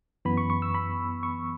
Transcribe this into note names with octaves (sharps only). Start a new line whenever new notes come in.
F#2 E3 B3 B5
C#6
C#6
E6
B5
C#6